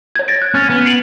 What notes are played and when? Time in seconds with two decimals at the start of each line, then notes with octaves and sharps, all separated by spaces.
0.16 C#5 G#6
0.28 A6 A#6 D7
0.42 F#6
0.54 C#4 F6 A6
0.70 B3
0.86 C7 D7 F#7